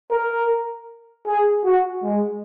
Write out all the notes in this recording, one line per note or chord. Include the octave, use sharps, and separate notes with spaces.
A#4
G#4
F#4
G#3